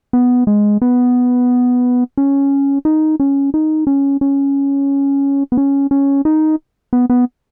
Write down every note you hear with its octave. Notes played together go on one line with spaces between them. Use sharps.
B3
G#3
B3
C#4
D#4
C#4
D#4
C#4
C#4
B3
C#4
C#4
D#4
B3
B3